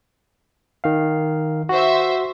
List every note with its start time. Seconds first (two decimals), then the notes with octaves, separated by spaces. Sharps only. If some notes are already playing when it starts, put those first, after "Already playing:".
0.84 D#3 F5
1.69 F#4 C5 E5